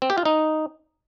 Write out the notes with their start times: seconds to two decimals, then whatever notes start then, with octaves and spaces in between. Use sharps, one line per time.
0.02 C4
0.10 G4
0.18 F4
0.25 D#4